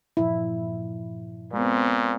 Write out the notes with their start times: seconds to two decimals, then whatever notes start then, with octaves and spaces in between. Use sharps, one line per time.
0.17 G2 A#2 F3 E4
1.53 A#2 G#3 B3 C4